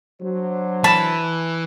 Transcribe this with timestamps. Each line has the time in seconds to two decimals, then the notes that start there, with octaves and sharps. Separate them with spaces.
0.21 F#3 D4 C5
0.84 E3 A5 B5